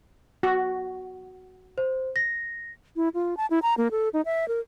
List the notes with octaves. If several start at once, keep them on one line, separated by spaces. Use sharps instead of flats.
F#4
C5
A#6
E4
F4
A5
E4
A#5
A#3
A4
D#4
E5
A#4